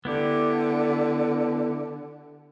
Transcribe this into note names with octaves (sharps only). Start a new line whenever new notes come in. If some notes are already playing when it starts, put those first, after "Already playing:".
D3 B3 E4 G4